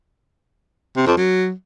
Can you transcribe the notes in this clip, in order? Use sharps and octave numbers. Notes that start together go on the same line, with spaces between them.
C3
F2
F#3